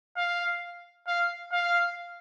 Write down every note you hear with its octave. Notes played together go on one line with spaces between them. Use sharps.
F5
F5
F5